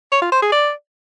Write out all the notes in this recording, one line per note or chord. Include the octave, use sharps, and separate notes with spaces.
C#5
F4
C5
G#4
D5